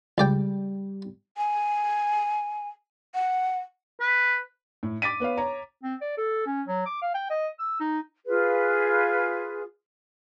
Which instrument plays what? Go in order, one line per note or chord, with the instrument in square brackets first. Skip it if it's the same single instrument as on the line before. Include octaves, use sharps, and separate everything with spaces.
[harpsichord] C#2 D5 G5 [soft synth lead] G3
[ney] G#5
F#5
[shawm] B4
[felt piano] A2
D6 A6 B6 D#7
B3 B4 C#5 F5
C#5 A#5
[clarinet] C4
D5
A4
C#4
F#3
D6
F5
G5
D#5
E6
D#4
[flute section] F4 G#4 B4